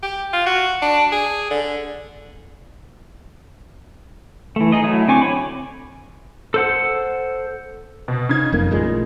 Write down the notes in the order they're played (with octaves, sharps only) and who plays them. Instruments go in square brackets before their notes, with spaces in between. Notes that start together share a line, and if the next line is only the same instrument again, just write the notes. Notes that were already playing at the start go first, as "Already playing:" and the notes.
[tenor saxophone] G4
F4
F#4
D4
G#4
D3
[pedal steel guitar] E3 A3
D#4 G#4 D#5
F#3 A3 E4
D3 C4 G#5 C#6 D6
C#5 B5
[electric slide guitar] A4 C5 F#5
[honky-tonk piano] B2
C#3 D#4 G#6
[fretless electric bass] F#1 F2 A#3
A1 A#2 G#3